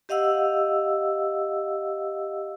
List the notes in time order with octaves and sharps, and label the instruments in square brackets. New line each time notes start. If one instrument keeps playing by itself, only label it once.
[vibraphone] G4 D#5 F5 F#5 E6